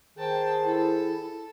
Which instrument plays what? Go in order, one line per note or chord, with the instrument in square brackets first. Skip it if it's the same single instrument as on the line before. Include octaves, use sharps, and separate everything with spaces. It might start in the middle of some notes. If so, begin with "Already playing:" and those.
[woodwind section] D#3 C5 [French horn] G#4 [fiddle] G5 A5
[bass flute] E4 [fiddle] A4